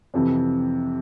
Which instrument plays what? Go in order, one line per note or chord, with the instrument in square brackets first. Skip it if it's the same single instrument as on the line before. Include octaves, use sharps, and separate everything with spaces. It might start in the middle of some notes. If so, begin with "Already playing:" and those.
[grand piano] F2 C3 E3